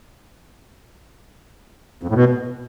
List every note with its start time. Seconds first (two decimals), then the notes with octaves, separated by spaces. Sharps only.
2.03 F2
2.09 A2
2.14 B2